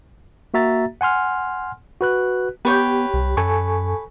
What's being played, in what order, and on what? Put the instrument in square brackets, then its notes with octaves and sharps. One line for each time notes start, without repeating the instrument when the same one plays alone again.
[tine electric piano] A#3 F#4 E5 A#5 A6
F#5 G#5 C6 F6
F#4 B4 F#6
[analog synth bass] B3 [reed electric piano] G4 [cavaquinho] B4 C#5 G5
[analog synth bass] C2
[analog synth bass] F#2 [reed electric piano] A4 G#5 C#6